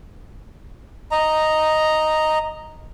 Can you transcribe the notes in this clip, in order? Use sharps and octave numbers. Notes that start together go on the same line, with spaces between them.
D#5 A#5